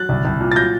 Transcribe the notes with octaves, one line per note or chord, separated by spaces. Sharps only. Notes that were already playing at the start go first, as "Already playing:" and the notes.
Already playing: F#3 F#6 A6
C2
C2
A#2
A6
F#3 G6 A#6